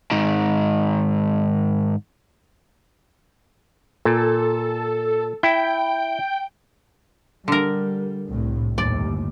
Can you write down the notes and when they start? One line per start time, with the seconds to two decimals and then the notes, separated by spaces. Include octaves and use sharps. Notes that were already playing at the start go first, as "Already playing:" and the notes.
0.11 G#2 D#3
4.05 A#2 A4
5.43 E4 G5
7.48 D3 G3 A#4
8.28 C2 A2
8.78 G1 D#2 A2 D5